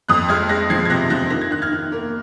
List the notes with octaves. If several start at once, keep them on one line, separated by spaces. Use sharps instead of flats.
F2 D#6 F#6
G#3 F6 G#6
G#3 F#6 A#6
F3 G#6 C7
G#6
C3 F#6 A#6
F3 F#6 A#6
D#3 A#6
G#6
D#3 F#6
F6 G#6
D#3
A#3